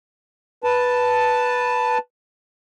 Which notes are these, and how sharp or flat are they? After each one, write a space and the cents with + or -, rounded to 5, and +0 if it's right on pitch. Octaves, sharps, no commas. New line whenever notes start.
B4 -5 A5 +0